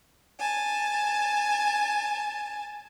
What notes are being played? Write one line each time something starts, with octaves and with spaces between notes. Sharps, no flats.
G#5 A5